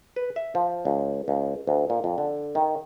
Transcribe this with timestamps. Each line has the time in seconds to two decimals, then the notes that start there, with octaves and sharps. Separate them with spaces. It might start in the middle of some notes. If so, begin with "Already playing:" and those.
0.16 B4
0.36 E5
0.55 F3
0.85 C#2
1.28 C#2
1.67 D2
1.90 A#2
2.04 F2
2.18 D3
2.55 D#3